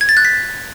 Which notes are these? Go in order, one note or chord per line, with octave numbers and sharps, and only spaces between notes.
G#6
A6
F#6
B6